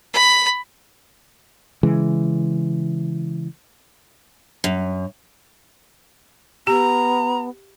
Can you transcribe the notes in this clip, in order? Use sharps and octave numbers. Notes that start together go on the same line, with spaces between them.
B5
C#3 E3 G#3
F#2
B3 G4 A#5